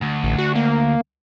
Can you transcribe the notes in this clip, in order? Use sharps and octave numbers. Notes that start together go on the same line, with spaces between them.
D2
A1
F#4
A#3